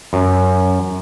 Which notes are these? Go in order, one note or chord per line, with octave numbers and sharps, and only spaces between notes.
F#2